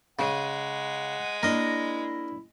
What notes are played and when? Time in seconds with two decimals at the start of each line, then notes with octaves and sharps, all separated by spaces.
0.19 C#3 G#3 F#5
1.43 A#3 D4 E4 A#4 D#5